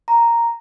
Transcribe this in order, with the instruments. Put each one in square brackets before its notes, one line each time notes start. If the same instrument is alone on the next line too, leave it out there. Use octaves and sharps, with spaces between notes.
[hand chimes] A#5